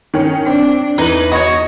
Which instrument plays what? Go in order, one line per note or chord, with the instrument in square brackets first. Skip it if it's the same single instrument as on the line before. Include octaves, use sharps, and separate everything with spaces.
[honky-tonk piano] D#3 C#4
[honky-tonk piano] C4 [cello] D4
[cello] E2 [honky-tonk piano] E3 [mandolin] D#4 B4
[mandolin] F#4 C#5 [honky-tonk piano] D#5